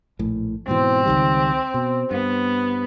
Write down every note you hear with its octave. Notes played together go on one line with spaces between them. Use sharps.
A#1 A2
G#2 B2 E3 C4
C#2 D#3 G3
B2
G2 B3